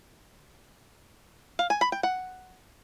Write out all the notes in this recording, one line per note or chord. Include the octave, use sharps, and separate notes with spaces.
F5
G#5
B5
G5
F#5